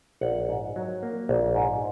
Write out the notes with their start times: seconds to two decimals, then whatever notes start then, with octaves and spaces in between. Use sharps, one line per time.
0.21 A#1 F#5
0.49 G#2
0.76 F#3
1.03 A#3
1.29 A#1
1.55 G#2